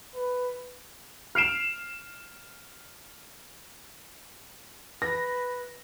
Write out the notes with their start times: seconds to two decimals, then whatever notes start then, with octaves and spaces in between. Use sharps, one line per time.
0.15 B4
1.35 F6 C7 D7 E7
5.02 B4 A#6